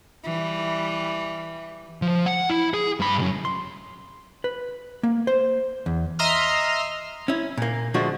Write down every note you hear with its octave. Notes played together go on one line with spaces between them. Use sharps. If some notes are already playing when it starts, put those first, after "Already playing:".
E3 G3
F3
F#5
E4
G#4
G2 B5
C#2 F#2
C6
B4
A#3
C5
E2
D#5 E5 A#5 C6 D#6 F6
C#4 E4
A#2 A#3
D3 F3 G#3 A3 F#4